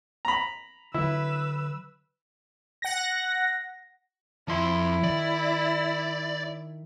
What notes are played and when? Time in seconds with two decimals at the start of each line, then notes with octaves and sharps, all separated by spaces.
0.25 A#5 B5
0.94 D3 F#3 E4 B4 E6
2.82 F#5 A#6
4.48 F2 E4 C6
5.04 D#3 D5